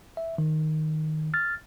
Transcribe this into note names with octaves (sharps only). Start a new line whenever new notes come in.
E5
D#3
F6 A6